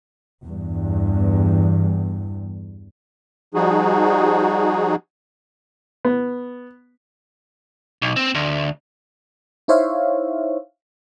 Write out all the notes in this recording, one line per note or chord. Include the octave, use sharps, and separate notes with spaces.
E2 G2
F3 G3 D#4 F#4 G#4
B3
B1
C4
D2
D#4 E4 C5 C#5 E5 F5